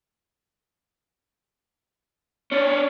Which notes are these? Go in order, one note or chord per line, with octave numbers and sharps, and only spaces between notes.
C#4 D4 C#5